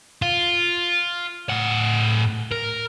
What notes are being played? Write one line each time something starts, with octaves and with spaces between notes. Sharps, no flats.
F4
A2 F#5
A#4